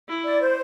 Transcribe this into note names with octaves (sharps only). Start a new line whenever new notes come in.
E4
D5
C5